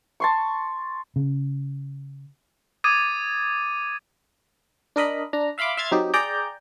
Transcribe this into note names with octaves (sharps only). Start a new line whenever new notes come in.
A5 C6 C#6
C#3
D6 D#6 G#6 A6 D#7
D4 A#4 D#5 B5
D4 A#5
E5 F5 B5 C6 D6
E5 C6 F6 G#6 A6
F#3 C4 D#4 G4
G#4 D5 G5 A#5 G6